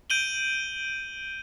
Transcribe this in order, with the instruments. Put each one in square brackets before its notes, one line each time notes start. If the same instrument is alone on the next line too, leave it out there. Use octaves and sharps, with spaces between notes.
[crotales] G6 D7 D#7 F#7 G7